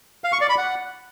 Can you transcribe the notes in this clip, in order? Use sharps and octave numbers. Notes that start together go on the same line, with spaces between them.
F5
C#6
D5
B5
F#5